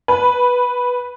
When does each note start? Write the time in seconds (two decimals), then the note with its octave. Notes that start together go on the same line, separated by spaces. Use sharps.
0.08 B4